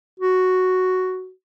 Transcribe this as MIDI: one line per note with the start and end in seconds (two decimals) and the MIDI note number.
0.19 1.31 66